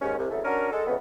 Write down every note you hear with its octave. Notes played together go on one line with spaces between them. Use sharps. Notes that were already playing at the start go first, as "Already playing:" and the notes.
D#2 G#2 C#4
C2
E2 C#3 F#3 A3
C#4 D4 F#4 A#4
G#3 A4
F2 C#3 E3 B3